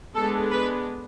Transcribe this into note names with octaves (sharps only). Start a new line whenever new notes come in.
G#3 B3 D4 A4
B4